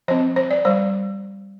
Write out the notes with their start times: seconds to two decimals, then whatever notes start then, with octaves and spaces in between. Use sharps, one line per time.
0.08 F3 C4 C5
0.36 C5
0.51 D5
0.65 G3 C5